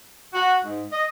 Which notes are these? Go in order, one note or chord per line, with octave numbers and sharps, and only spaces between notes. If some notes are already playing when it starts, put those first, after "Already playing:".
F#4
G#2
D#5